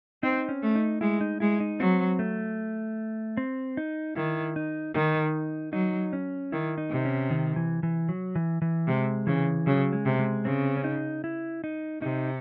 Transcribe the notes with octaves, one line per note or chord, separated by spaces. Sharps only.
C4 D#4
C#4
A3
D#4
G#3 E4
D#4
G#3 E4
D#4
F#3 C4
A3
C4
D#4
D#3 E4
D#4
D#3 D#4
F#3 D#4
C#4
D#3 E4
D#4
C3
C#4
D#3
E3
E3
F#3
E3
E3
C3 G#3
C#3 E3
C#3 F#3
G#3
C3
G#3
C#3 C4
C#4
D#4
E4
D#4
C3 D#4